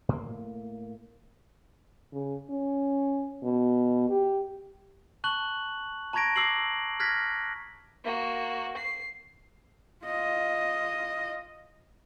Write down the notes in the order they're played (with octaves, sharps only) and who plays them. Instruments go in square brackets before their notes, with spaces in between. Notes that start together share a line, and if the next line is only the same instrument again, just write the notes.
[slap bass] A2 A#3
[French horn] C#3
C#4
B2
G4
[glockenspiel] A5 C#6 F#6 F#7
A5 A#5 C#6 G#6 A#6 D7
D6 E6 A#6 C7 F#7
F6 F#6 G#6 A#6 B6
[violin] A#3 F#4
C7
[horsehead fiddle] F4 D#5